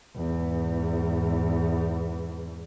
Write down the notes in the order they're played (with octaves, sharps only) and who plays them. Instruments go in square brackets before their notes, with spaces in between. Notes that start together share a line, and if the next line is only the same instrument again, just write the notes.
[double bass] E2 G#2